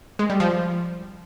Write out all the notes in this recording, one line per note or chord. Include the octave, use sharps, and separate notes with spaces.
G#3
G3
F3